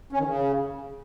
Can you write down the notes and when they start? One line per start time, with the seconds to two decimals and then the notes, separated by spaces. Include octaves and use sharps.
0.12 C#4
0.19 D#3
0.26 C#3